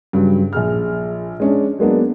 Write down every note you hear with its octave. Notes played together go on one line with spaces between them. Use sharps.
G2 C#3 F#3
A#1 G#4 F6
G#3 C#4 D4
F#3 G#3 A#3 B3 D4